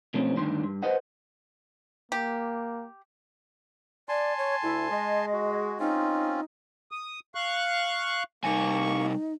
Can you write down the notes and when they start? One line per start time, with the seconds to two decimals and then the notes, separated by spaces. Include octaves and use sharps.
0.14 B2 F3 A3 C4 C#4
0.36 D2 G2 D#3 D4 C6
0.63 G2
0.83 B4 C5 D#5 F#5
2.12 A#3 G4
4.09 D5 G#5 A5 C6
4.38 C#5
4.63 D2 E4
4.91 G#3 D#5
5.33 F#4
5.80 C4 C#4 D#4 F4
6.91 D#6
7.35 F5 C#6 F#6
8.44 C3 G3 A#3 D#4 G#5 C#6